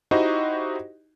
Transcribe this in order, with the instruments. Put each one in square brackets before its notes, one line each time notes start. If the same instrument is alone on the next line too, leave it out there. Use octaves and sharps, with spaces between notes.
[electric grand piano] D#4 E4 F#4 G4 C5 D#5